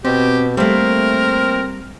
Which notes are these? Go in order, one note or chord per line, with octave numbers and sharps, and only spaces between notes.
B2 C4 G4
G3 A3 A#3 C4 A#4